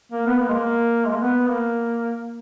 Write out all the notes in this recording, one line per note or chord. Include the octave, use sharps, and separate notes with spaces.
A#3
B3
A#3
G#3
A#3
G#3
A#3
B3
A#3